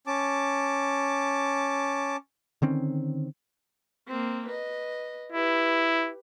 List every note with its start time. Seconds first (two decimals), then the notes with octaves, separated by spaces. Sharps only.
0.07 C#4 A5 D6
2.62 D3 D#3 C4 C#4
4.08 A#3 C4
4.47 B4 D#5
5.32 E4 G4 B4